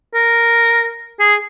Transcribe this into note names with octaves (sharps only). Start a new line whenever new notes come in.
A#4
G#4